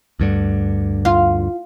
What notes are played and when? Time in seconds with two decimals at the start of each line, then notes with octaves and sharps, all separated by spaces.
0.20 D2 G2 D3
1.05 F4